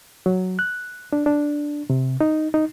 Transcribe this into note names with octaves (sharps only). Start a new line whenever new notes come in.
F#3
F#6
D4
D4
C3
D#4
D#4